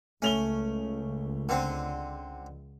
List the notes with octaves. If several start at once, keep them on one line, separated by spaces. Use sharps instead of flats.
C#2 A3 C#4 F7 G7
D3 C4